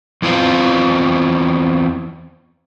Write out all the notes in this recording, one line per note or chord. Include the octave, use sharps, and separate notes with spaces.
E2 E3 C4 F4